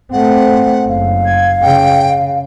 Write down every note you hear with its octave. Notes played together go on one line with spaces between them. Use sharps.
A3 C4 F#5
F#1 F5
G#6
C#3 G5